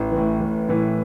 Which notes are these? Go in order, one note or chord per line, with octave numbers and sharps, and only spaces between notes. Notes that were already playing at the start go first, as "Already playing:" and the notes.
Already playing: A1
A2 E3
A1
A2 E3